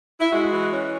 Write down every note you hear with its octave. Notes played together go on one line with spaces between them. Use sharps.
E4
G#3 F#4
E3
C#4